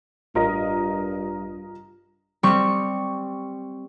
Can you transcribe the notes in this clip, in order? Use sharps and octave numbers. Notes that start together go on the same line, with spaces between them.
A1 G2 F4 A#4 D#5
G3 C4 C#6